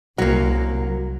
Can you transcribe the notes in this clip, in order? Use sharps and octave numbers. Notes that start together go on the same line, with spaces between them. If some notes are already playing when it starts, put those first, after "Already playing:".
C2 F#3 A#3